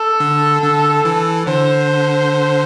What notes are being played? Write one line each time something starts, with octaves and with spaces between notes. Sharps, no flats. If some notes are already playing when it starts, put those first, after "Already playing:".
Already playing: A4
D3
D3
E3
D3 C5